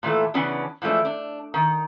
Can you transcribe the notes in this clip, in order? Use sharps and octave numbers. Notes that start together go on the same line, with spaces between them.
A#2 E3 A3 A4
C#3 E3 B3 C#4 D4
E3 F3 G#3 A3 D4
D4
D#3